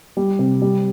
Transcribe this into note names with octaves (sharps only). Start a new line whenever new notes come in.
G3
C3
G3